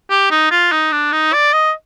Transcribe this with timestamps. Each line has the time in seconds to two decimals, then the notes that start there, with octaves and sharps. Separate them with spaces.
0.10 G4
0.31 D#4
0.51 F4
0.72 D#4
0.92 D4
1.12 D#4
1.33 D5
1.53 D#5